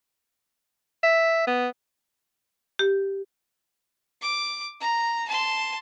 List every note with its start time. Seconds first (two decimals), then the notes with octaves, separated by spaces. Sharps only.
1.03 E5
1.47 B3
2.79 G4
4.21 D6
4.80 A#5
5.28 A5 C6